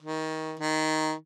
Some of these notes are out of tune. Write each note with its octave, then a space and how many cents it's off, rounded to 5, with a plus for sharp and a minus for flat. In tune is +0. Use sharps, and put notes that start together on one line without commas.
D#3 +20
D#3 +5